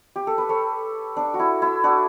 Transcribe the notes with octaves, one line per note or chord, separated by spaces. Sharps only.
G4
A4
B4
A4 C#5
D4
F#4
E4
E4
D4 F#4